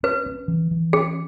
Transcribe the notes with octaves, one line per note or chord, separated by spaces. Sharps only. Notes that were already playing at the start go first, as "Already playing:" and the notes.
C#4 B4
C#4
E3
E3
C#4 G#4